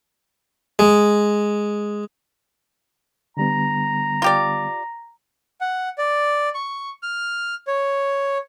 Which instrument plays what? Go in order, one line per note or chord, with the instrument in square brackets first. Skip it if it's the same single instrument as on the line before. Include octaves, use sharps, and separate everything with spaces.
[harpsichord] G#3
[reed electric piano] D3 G3 B3 [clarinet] A#5
[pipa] F4 G4 D5
[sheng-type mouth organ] F#5
D5
C#6
F6
C#5